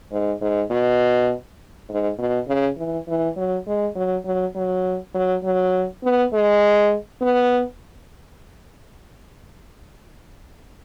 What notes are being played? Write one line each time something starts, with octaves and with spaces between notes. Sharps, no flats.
G#2
G#2
B2
G#2
B2
C#3
E3
E3
F#3
G#3
F#3
F#3
F#3
F#3
F#3
B3
G#3
B3